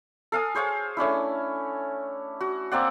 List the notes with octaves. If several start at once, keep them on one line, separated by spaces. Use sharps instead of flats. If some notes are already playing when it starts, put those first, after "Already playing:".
A4 F5 G#5 D#6
G#4 C5 C#5 F5
A3 C#4 D4 E4
F#4
A#3 C4 D5 F#5